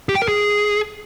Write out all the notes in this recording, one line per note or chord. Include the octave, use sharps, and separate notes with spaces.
G4
G5
A#4
G#4